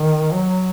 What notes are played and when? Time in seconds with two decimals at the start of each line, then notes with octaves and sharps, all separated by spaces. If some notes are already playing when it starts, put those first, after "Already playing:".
Already playing: D#3
0.32 F#3